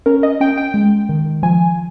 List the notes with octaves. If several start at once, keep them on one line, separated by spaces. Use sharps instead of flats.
C#4 A#4
D#5
C#4 G5
G5
G#3
D#3
F3 G#5